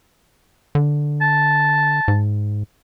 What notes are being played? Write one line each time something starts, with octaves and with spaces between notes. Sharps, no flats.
D3
A5
G#2